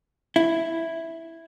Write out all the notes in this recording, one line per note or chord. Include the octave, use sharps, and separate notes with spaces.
E4